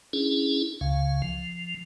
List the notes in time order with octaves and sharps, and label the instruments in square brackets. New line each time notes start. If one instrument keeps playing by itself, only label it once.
[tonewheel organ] C#4 D4 E4 G#4
C#2 C#3 F5
F3